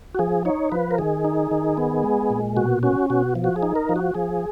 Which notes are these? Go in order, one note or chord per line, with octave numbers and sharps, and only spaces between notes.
F#4
F3 G#4
D#4 C#5
F3 B4
A#4
D#3 G#4
D#4
D#3
B3
G#3
A#2
B2 F#4
C#4 F#4
B2 F#4
F3
F#4
G#4
D#4
A#4
F3
F#4
F3 G#4